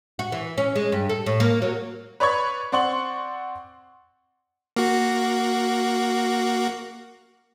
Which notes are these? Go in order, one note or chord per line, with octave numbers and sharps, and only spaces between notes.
F#4
E3
C#4
G#3
G2
A4
A2
A#3
F#3
B4 C#5 D5 B5 C#6 G#6
C4 D5 F#5 C6 C#6 F#7
A#3 F#4